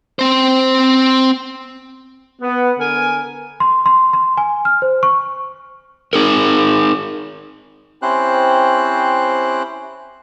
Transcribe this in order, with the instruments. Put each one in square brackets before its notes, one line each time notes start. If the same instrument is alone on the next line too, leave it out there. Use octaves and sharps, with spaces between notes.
[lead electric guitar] C4 C5
[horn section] B3
D3 A#4 G#5
[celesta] C6
C6
C6
G#5
F6
C5
C#6
[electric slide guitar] D#4 G#4 A#4
[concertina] C4 C#4 E4 G4 C5 F#6